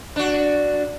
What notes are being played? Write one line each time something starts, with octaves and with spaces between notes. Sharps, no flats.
D4 F#4